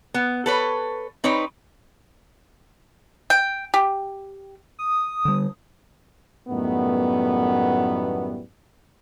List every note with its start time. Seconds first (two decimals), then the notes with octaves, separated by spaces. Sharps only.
0.14 B3
0.46 A4 B4 C#5
1.24 C4 D#4 B4 C#5
3.30 G5
3.74 G4
4.79 D#6
5.25 D3 G3
6.48 F#2 A2 D#3 G3 A3 B3